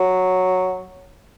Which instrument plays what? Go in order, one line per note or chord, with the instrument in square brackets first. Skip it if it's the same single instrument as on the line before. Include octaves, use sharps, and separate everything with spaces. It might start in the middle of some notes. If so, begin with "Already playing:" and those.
Already playing: [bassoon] F#3